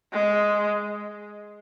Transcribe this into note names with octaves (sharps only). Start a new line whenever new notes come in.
G#3